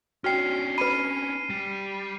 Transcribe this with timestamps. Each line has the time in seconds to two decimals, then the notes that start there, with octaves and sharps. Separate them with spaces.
0.24 C#4 D4 F#4 G5 F6 C7
0.78 B4 B5 D#7
1.50 G3